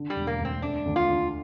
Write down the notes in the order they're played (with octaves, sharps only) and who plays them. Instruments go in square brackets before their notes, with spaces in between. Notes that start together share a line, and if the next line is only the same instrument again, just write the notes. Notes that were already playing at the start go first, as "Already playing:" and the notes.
Already playing: [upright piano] D3
[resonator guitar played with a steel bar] G3
[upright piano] E1
[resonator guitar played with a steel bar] A#3
[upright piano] D2
[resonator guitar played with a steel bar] C4
[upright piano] A3 [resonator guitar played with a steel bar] D4
[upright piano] D2
[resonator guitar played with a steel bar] F4
[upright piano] D3